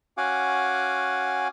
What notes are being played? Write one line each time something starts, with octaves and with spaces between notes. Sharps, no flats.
C#4 F#4 F5 F#5 G#5 D6